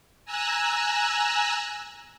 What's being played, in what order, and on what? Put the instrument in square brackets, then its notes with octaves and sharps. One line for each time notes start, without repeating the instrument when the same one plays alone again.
[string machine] G#5 A#5 E6 F#6